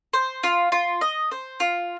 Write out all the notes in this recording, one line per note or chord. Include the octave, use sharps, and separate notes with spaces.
C5
F4
F4
D#5
C5
F4